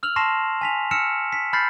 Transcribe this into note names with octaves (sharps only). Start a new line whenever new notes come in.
E6 F6 F7 F#7
A5 C6 C#6 A#6 C7 E7
G#5 B6 F7
E6 F6 A#6 C#7 D7 E7
B6
B5 F6 G6 A6 B6 C7